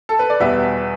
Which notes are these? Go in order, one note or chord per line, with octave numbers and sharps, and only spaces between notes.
A4
B4
D5
E2 B2 G3 B3 B4 E5